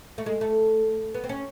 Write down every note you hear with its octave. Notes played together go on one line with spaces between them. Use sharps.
A3
G#3
A3
B3
C4
C#4